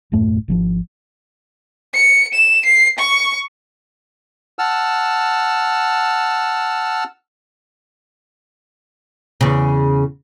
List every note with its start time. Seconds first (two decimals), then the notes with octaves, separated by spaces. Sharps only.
0.12 D#1 F#2 A2 A3
0.48 G#1 E3 F3
1.94 C#7
2.34 E7
2.65 C7
2.98 C#6
4.59 F#5 A5 E6 F6
9.41 E2 C#3